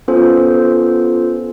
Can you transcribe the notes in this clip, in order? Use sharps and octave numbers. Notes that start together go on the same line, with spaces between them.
B3 C#4 F4 A4 C5